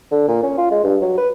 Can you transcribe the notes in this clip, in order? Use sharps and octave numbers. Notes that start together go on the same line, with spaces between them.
D3
A#2
C#4
F4
G#3
G2
F#3
B4